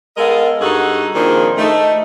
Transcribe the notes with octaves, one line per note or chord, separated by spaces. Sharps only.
G#3 B3 A4 A#4 D#5 F5
G2 D#4 F#4 G#4 A4 F#5
A#2 D#3 F3 C4 D4 G#4
A3 D#4